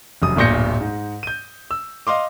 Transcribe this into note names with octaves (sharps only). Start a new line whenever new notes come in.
F1 F#2 D#6
D1 G1 A#2 G6 A#6 C#7
G#2
G6 D#7
E6
D#5 F5 C6 D6